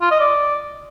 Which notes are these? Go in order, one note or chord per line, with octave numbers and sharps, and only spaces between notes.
F4
D#5
D5